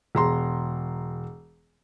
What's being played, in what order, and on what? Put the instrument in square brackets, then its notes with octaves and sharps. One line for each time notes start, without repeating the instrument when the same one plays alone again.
[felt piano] E1 A#5 C6